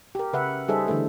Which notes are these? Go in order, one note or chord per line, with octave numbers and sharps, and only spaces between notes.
G4 A#4
C#3 B4 E5 F#5
G3 D#4 G#4 A4 C5 E5
D3 E3 A3